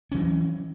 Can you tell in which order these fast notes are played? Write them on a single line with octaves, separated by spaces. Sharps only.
C#4 E3 F#3